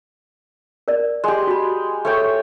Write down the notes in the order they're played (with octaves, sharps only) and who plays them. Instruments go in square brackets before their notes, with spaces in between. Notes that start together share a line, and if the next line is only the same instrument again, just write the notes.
[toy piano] A#4 D5
[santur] G#3 G4
[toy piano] F#4 B5
[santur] A3 C#5 G5